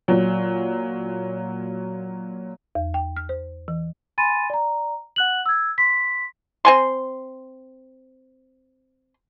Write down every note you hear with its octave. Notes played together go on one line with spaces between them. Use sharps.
A#2 F#3
E2
G5
F6
C5
E3
G#5 B5 C6 A6 D#7
D5 A#5
F#5 F#6 F#7
E6 G#6
C6 B6
C4 G#5 C6